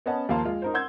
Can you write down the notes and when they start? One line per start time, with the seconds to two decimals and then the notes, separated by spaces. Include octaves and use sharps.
0.06 B3 C#4 D#5 F#5 A5
0.29 D#2 F3 A#3 F5 A5 C6
0.45 G#3 F4
0.62 D#4 A#4 C5
0.74 F#5 C6 E6 G6 G#6